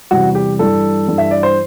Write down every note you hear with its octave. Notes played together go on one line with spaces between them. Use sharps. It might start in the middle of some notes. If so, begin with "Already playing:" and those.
E2 C3 E3 G3 F#4
G4
G2 E3 G3 A4
G2 E3 G3
E5
D5
C5